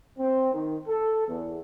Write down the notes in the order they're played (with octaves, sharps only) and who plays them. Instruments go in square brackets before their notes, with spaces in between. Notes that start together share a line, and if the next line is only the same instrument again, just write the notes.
[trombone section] C4
D#3
A4
E2